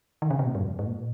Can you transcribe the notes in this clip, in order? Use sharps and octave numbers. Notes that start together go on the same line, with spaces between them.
D#3
C#3
C3
A#2
G2
F2
G#2
A#2